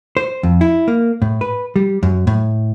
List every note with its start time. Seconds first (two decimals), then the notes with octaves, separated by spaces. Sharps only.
0.17 C5
0.43 F2
0.61 E4
0.88 A#3
1.22 A2
1.41 B4
1.76 G3
2.03 F#2
2.27 A2